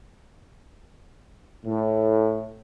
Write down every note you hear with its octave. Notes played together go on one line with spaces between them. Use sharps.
A2